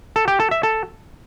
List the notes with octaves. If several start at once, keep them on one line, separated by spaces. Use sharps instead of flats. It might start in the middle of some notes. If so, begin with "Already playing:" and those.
A4
G4
A4
E5
A4